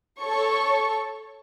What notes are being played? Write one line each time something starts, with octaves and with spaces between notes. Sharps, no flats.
A4 C#5 C#6